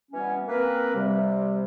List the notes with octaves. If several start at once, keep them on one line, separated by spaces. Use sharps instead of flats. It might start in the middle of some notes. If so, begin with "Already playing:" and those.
B2 E3 G3 B3 C#4
A#3 C4 A#4 B4
C3 G3